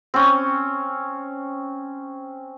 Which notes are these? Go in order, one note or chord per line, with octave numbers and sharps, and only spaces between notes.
C4 C#4